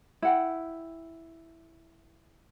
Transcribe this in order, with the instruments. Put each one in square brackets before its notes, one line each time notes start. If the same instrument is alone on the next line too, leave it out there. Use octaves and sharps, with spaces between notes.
[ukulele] E4 F#5 G5